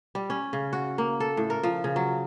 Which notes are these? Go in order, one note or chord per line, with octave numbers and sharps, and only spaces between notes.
G3
C#4
C#3
F#4
A#3
A4
A2
A#4
F3
C#3
F#3